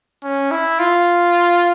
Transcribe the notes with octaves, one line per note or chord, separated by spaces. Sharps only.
C#4
E4
F4